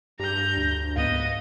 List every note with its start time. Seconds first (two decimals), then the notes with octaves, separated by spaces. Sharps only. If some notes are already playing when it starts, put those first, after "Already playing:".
0.20 G2 G4 A#5 G6
0.57 D2 D4
0.96 C#2 G#2 B3 D#5 F5